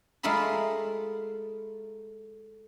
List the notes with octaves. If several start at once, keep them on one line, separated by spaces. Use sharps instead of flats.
G#3 A3 F4 A#4 E5 B5